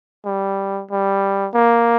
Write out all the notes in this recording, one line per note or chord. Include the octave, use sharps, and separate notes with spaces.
G3
G3
A#3